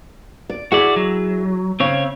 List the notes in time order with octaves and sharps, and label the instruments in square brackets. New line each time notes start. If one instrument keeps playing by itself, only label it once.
[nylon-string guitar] D5
[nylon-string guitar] E4 G#4 E5 [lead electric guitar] F#4 D5
[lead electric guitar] F#3
[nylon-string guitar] C#3 [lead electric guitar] C4 C#5